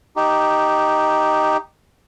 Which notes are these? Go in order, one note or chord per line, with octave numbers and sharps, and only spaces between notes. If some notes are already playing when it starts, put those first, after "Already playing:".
D#4 G4